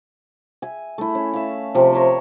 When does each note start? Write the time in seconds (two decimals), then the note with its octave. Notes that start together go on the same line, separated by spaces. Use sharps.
0.62 E5 G#5
0.98 A3 E4
1.15 C#4
1.33 E5 F5
1.75 C3 F3
1.93 A#4 C#5 E5 C6